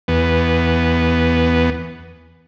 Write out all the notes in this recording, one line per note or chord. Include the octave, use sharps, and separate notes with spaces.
E2 B3